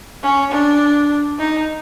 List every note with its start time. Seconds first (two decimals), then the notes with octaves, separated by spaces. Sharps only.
0.23 C#4
0.51 D4
1.38 D#4